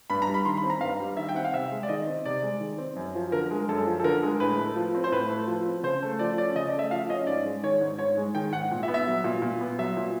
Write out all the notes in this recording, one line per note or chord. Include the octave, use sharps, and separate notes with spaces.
G2 B5
A#5
G3
B5
D#3 C6
B5
C4
A#5
G2 F5
G3
D#3 E5
G5
C4 F#5
F5
C3 E5
G#3
D5
D#3 D#5
C4
C3 D5
G#3
D#3
C4
F#2
F3
D3 A#4
G#3
F#2 A4
F3
A4
D3 A#4
G#3
A2 B4
A3
F3
C4
C5
A2 B4
A3
F3
C4
C#3 C5
A3
F3 D5
C#4 D5
C#3 D#5
D5
A3
E5
F3 F5
C#4 D#5
G#2 D5
G#3
D#3 C#5
G#2
G#2 C#5
G#3
D#3 G5
G#2 F#5
A#2
E5
B3
E5
F#3
A#2
A#2
B3
F#3 E5
A#2